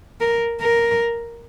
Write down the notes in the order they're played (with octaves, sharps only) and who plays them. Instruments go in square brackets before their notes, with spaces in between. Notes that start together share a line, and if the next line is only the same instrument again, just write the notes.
[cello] A#4
A#4